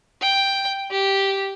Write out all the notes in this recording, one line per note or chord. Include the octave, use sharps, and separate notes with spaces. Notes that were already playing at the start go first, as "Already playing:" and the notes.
G5
G4